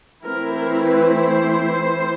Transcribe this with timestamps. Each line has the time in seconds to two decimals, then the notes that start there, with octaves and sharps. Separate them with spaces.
0.24 E3 A3 C4 E4 A#4
0.55 A#4
0.85 B4
1.17 C5